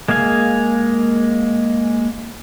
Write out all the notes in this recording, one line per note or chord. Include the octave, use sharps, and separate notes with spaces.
G#3 A#3 G#4 F5 G#5